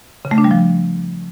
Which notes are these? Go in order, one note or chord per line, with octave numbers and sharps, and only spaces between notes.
C#3
A3
D4
G3
F3